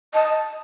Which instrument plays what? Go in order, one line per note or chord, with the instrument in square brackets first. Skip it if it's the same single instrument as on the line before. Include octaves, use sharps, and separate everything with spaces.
[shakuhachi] D#5 [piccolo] A5